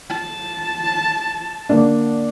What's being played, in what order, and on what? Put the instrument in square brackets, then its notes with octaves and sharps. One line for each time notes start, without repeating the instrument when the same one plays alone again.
[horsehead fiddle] A5
[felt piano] D3 A#3 D4